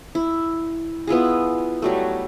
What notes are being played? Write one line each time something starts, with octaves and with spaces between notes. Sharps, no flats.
E4
B3 E4 F4 G#4
F#3 G3 A3